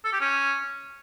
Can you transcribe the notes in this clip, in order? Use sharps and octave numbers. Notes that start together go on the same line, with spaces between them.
A4
G4
C#4